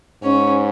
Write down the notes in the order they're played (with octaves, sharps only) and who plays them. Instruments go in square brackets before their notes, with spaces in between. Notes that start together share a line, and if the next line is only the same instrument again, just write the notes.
[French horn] G#2 [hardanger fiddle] C#4